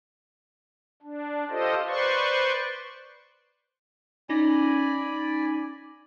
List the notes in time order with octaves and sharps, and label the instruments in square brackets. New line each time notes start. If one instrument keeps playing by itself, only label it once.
[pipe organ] D4
F4 G4 A4 C5 D#5
B4 C5 D5 C6 C#6
[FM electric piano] C#4 D#4 A#6 [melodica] D5 G#5 B5